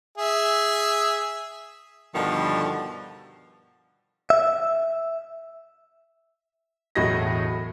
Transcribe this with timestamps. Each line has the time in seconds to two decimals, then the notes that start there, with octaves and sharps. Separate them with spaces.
0.18 G#4 E5
2.15 G2 B2 D3 D#3 F3
4.30 E5
6.95 E1 A2 F#3 F#4 D#5 A#6